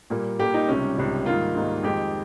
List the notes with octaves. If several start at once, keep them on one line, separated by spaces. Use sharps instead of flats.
A#2 G3 A#3
A#2 G3 A#3 G4
D#4
C#2 C3 G3 C#4
C#2 C3 G3
G#2 D#3 G3 A#3 F4
G#2 D#3 G3 A#3
F2 D#3 G#3 G4